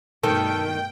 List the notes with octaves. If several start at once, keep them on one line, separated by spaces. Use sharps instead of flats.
G2 B2 D#3 A3 A4 G5